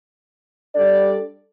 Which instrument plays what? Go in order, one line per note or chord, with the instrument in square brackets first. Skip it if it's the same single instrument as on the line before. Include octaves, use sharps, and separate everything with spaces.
[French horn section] G3 D4 A4 D5